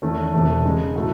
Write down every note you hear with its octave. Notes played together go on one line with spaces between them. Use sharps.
E2 D#3 A3 C#4
E1 E2 C3 E3 A3
C#3 G#3 D#4
A2 F#3 A3